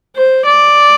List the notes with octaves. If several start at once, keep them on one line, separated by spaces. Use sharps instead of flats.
C5
D5